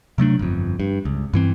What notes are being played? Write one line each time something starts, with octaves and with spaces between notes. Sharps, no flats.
C3 F#3 A3 D4
G1 F2
G2
C#2
G2 E3 C4